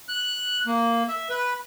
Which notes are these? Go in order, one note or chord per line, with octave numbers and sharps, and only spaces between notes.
F#6
A#3
E5
B4